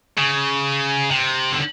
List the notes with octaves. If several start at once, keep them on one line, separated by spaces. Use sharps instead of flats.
C#3
C3
D3